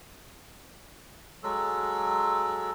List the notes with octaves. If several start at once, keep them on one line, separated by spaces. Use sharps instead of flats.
F#3 G#3 A4